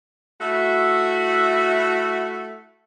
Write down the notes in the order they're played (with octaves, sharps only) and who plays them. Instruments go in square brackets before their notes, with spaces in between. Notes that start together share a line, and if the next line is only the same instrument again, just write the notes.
[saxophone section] A3 E4 F#4